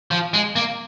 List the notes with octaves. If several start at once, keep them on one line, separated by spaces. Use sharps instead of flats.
F3
G#3
A#3